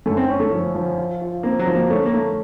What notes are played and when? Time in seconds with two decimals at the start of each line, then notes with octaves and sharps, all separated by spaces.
0.06 F#2 A3
0.17 C4
0.28 C#4
0.40 A3
0.52 F3
0.75 F3
0.98 F4
1.21 F4
1.43 A#3 C4
1.59 F#3
1.67 F3
1.75 A#3
1.90 A3 C#4
2.06 A#3
2.13 A3